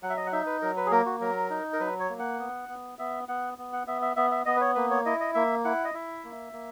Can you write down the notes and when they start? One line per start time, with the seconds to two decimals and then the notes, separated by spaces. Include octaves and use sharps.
0.03 F#3 F#5
0.10 E5
0.17 D#5
0.27 F#5
0.32 D#4 E5
0.46 B4
0.62 F#3 A#4
0.77 B4
0.86 G#4
0.91 A#3 A#4
1.06 F#4
1.21 F#3 A#4
1.50 D#4
1.73 A#4
1.80 F#3 B4
2.00 C#5
2.10 A#3
2.19 F#5
2.39 B3
2.69 B3
2.99 B3 E5
3.29 B3 F#5
3.58 B3
3.73 F#5
3.87 B3 E5
4.02 E5
4.16 B3 E5
4.31 E5
4.46 B3 D#5
4.56 B4
4.61 C#5
4.75 A#3 B4
4.91 C#5
5.05 E4 D#5
5.20 D#5
5.34 A#3 E5
5.65 E4 F#5
5.84 D#5
5.94 E4 E5
6.24 A#3
6.53 A#3